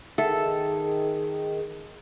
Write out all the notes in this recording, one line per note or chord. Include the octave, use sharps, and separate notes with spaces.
D#3 G#4 A4 E5 F#5